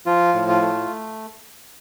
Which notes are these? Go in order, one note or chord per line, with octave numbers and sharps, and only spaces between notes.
F3 F4
A2
F4
A3